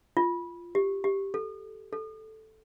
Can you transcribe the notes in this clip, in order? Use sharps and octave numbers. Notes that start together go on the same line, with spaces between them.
F4
G4
G4
A4
A4